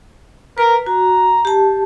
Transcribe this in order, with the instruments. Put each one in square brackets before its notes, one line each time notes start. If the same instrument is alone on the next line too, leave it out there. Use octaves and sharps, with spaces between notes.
[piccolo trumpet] A#4 [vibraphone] B4
[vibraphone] F#4 [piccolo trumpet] A#5
[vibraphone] G4 A5